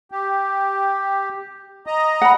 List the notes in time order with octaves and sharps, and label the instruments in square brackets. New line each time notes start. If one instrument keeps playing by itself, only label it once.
[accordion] G4
D#5 A#5
[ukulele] F#5 B5